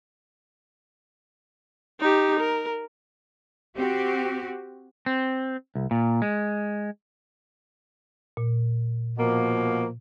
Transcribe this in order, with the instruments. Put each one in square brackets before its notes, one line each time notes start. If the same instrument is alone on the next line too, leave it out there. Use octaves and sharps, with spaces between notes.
[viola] D#4 G4
A#4
[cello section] C4 F#4 G4
[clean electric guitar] C4
C2
A#2
G#3
[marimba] A#2
[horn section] B2 F3 A#3